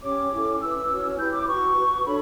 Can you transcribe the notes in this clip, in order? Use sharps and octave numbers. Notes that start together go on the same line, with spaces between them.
C#4 G4 C#5 D6
C#4 E4 A4
E4 B4 E6
C#4 F#4 C#5
E4 G4 B4 G6
D6
F#4 B4 C#6
F#4 B4
D4 A4 C#5 B5